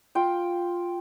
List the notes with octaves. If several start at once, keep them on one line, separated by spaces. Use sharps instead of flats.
F4 G5